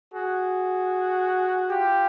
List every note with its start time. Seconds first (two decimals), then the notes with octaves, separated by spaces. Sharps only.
0.14 F#4 G#4
1.71 F4 G4